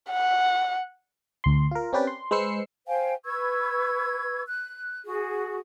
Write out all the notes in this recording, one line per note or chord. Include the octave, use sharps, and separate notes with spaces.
F#5
D2 C6
F4 A#4
C4 C#4 G4 B4 D5
C6
G#3 B4 C5 E6 C7 C#7
C5 F5 G5 G#5
B4 C#6 E6 G#6
F#6
F#4 G#4